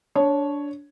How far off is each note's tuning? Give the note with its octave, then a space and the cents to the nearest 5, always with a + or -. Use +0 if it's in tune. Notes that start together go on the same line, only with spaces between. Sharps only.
D4 -20 C#5 +0